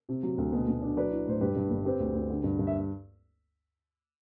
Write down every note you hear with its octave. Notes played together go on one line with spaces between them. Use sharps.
C3
F#3
D2
B2
B2
D4
F#3 B4 D5
E4
A2 C5
G2 G4 B4
G2
G1
C4 G4 B4
D2
D2
D3
G2
G2
E5